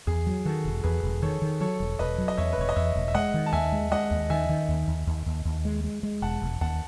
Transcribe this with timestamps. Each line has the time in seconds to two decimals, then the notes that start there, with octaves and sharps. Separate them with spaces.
0.07 E2 G#4
0.27 F#3
0.45 D#3 F#4 A4
0.65 E1
0.83 E2 G#4 B4
1.03 E1
1.22 D#3 A4 C#5
1.42 D#3
1.60 F#3 A4 C#5
1.80 E1
1.99 E1 B4 D#5
2.18 F#3
2.28 D#5
2.37 E2 C#5 E5
2.53 B4
2.58 E1 C#5
2.69 D#5
2.76 E2 C#5 E5
2.95 E1
3.08 E5
3.15 G#3 D#5 F#5
3.34 D#3
3.46 A5
3.53 D#2 E5 G#5
3.72 G#3
3.92 G#3 D#5 F#5
4.11 D#2
4.30 D#3 E5 G#5
4.49 D#3
4.69 D#2
4.88 D#2
5.07 D#2
5.26 D#2
5.45 D#2
5.65 G#3
5.84 G#3
6.03 G#3
6.22 E1 F#5 A5
6.42 E1
6.61 D#2 F#5 A5